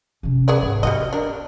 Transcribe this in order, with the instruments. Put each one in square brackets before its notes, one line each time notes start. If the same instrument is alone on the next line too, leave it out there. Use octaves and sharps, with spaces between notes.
[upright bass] C3 C#4
[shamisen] B3 G#4 D5
[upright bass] G#2
[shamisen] G3 F#4 D#5 [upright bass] B3
[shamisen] D4 A#4